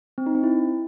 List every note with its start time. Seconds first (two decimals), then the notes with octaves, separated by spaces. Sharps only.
0.18 C4
0.26 D#4
0.35 C4
0.44 E4